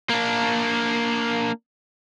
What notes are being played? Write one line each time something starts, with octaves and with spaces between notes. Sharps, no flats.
A#3 D4